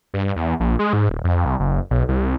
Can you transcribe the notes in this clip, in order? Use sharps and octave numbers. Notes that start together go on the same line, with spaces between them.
G2
E2
A#1
G#3
G#2
D#1
F2
C2
F#1
B1
C2